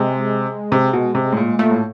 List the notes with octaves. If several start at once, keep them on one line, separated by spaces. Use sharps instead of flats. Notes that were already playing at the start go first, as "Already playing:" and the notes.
Already playing: C3 G#3
C3
B2
C3
A2
A#2
A#2 A3
A2